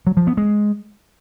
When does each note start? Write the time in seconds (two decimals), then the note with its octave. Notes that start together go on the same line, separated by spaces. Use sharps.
0.07 F#3
0.17 F3
0.27 B3
0.37 G#3